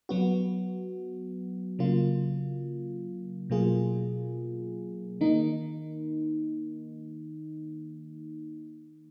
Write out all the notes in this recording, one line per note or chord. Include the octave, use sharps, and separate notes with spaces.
F#3 B3 F#4
C#3 F#3 A#3 F4
B2 F#3 A#3 F4 G#4
D#3 A#3 D#4